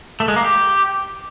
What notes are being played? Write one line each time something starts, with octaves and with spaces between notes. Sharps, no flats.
A3
G#3
A#3
G4